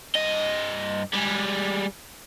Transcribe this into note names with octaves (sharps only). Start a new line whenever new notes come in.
G2 D#5
G3 G#3